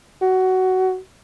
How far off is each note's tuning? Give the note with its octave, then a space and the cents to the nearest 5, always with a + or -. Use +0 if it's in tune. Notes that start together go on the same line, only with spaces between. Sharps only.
F#4 +15